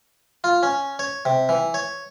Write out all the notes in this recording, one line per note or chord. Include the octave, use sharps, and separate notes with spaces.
F4
C#4
C#5
C3
E3
C#5